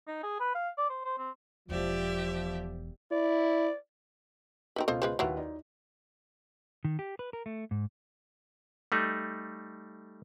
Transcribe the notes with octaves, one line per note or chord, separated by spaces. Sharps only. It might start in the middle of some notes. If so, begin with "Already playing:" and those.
D#4
G#4
B4
F5
D5
C5
C5
C4
E1 E2 F3 G4 D5 E5
E4 D5
C4 D#4 F#4 A#4 B4
C#2 B2 F4 A4 C5 D#5
G#3 B4 C5
D#2 F#3 E4 F4 B4 F#5
D#4 D5
D#3
G4
B4
A#4
A3
G#2
G3 A3 D#4